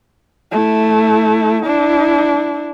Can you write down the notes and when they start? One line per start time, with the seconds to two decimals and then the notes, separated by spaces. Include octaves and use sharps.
0.52 A3 E4
1.62 D4 E4